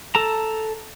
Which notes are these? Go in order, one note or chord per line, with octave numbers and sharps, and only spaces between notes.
A4 A5 A#5